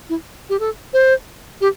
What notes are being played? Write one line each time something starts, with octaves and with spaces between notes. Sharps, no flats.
E4
G4
A4
C5
G4